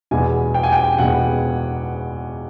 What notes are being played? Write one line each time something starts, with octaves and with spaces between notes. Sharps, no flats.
E2 B2 G#3 B3 G#5
G5
G#5
G5
E2 B2 G#3 B3 F#5